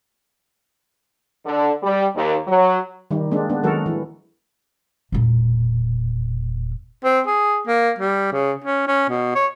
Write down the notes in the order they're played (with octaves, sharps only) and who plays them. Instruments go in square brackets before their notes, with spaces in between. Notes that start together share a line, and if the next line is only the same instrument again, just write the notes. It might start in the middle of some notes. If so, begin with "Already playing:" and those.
[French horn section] D3
G3
D#2
F#3
[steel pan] D#3 G3 D#4
G#3 A#3 C4 D4
B3 D4
D#3 F#3 G#3 F#4 A4 A#4
E3
[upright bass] E1 A#2
[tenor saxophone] C4
G#4
A#3
G3
C#3
C#4
C#4
B2
C#5